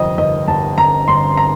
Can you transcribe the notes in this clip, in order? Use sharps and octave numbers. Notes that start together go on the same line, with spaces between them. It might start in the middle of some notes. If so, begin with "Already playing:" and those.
Already playing: G1 F2 C3 D#5
G1 D#5
G1 A5
G1 A#5
G1 C6
A#5